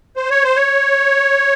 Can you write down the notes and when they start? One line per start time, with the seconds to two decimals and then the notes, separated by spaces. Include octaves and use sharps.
0.16 C5
0.30 C#5
0.44 C5
0.56 C#5